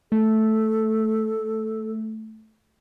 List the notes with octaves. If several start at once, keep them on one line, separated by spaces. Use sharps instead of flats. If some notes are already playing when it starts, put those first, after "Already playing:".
A3 A4